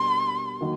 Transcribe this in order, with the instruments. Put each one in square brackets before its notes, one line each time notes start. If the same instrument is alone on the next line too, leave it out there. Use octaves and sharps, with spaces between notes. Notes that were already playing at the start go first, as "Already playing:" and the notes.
Already playing: [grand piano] B2 G3 A#3 D4 [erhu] C6
[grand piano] D#3 F#3 A#3 D#4 F#4